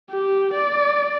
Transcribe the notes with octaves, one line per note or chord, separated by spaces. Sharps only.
G4
D5